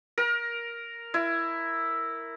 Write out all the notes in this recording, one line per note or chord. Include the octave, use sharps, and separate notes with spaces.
A#4
E4